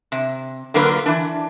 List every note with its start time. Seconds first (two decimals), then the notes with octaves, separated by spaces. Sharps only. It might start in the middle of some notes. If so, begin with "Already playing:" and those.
0.12 C3
0.74 D3 F#3 A#3 F4 A#4 B4
1.06 E3 D4